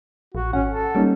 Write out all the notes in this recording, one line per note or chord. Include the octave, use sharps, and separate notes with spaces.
A#1 F#4
G#1 C#4 F#5
A4
G3 A#3 C#4 D#4